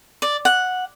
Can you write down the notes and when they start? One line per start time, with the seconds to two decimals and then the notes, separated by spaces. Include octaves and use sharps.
0.22 D5
0.45 F#5